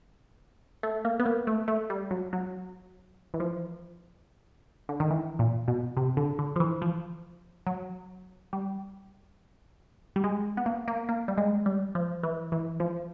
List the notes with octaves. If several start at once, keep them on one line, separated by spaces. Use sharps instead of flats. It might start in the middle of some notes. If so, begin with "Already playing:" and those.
A3
A#3
B3
A#3
A3
A3
G3
F#3
F#3
E3
F3
D3
D#3
E3
A#2
B2
C3
D3
D3
F3
E3
F3
F#3
G3
G3
G#3
B3
A#3
A#3
A#3
G3
G#3
G3
F3
E3
E3
F3